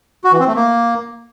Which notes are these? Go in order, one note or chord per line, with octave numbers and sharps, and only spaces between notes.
F#4
E3
C4
A3
A#3